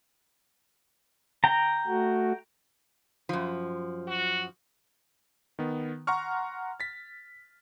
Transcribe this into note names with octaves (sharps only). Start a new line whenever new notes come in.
G5 A#5
A3 F#4
F#2 F3
F#4
D#3 B3
F#5 A#5 C6 C#6 F6
A6 B6